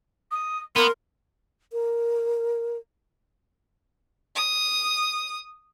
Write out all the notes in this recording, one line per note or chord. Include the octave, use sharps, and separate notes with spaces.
D#6
B3 A#4 C6
A#4
D#6